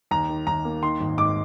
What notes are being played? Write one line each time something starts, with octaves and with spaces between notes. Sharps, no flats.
D#2 A#5
D#3
D#2 A#5
A#3
D#3 C6
G#1
G#2 D6